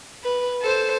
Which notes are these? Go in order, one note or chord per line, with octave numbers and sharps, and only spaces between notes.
B4
A4 C5